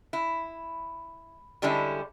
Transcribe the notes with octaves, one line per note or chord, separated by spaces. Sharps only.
E4
D3 G3 G#3 C#4 E4